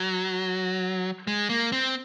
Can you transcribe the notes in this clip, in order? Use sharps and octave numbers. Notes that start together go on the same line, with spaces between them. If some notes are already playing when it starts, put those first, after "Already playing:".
Already playing: F#3
G#3
A#3
C4